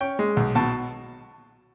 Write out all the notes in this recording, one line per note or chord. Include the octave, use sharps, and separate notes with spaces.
C#4 G5
G#3
B1
B2 A5